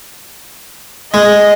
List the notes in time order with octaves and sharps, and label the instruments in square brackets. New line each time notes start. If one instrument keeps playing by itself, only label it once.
[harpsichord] G#3 [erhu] D#5